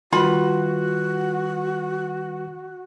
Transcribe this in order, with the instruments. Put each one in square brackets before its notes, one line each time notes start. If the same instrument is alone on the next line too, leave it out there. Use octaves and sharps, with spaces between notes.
[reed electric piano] D#3 G3 B4 [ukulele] F4 B5 [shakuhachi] F#4